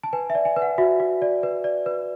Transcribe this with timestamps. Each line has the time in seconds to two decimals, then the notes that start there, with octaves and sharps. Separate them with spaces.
0.03 A5
0.13 B4 G#5
0.30 E5
0.35 D5
0.45 G#5
0.56 B4
0.62 F#5
0.78 F#4 E5
1.00 F#4
1.22 D5
1.43 B4
1.64 D5
1.86 B4